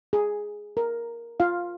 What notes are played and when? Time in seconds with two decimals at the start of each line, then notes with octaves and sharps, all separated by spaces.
0.13 G#4
0.77 A#4
1.40 F4 F5